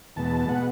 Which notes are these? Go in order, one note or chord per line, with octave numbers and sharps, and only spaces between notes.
E2 B2 G#3 B3 A5
A5
B2 G#3 B3 F#5